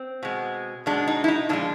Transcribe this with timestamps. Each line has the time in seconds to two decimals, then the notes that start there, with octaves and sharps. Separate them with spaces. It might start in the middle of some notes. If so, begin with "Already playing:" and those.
Already playing: C4
0.23 B2 G#3
0.86 B2 G#3 D4
1.07 D#4
1.24 E4
1.28 D#4
1.49 A#2 F3 G#3 D4